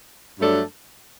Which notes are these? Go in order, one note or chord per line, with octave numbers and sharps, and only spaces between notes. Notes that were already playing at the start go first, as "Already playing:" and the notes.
G2 F#3 A3 D4 A4